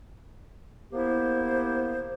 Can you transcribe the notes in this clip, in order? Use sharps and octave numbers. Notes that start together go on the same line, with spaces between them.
A#3 B3 E4 G4 C5